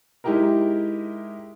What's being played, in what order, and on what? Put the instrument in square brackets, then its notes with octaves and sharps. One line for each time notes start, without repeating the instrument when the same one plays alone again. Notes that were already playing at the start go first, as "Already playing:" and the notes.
[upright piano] G#3 D#4 E4 G4 G#4 A#4